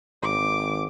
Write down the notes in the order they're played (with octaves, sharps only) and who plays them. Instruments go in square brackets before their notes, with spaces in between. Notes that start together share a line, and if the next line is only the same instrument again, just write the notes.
[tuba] G#1 [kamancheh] D6